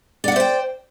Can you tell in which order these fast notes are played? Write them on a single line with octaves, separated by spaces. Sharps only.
D5 F#5 E5 C5 G5